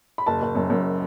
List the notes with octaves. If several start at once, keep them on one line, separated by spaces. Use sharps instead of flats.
B5
F#1 A5
F#1
F#2
F#2